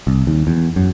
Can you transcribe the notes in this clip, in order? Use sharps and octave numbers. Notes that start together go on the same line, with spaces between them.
C2
D#2
E2
F#2